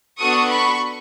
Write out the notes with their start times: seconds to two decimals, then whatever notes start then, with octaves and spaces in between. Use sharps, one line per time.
0.19 B3 D4 F#4 A4 C#6 D#6
0.49 B5 C#6